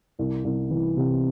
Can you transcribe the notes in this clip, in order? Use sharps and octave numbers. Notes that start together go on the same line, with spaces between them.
C2
C2
E3
C3